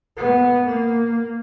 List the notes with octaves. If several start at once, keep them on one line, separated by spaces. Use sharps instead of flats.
B3
A#3